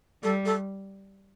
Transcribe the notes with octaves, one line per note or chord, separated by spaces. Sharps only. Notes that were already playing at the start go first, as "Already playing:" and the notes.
G3 A4
A4